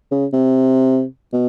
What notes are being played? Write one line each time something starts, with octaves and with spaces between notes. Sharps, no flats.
C#3
C3
B2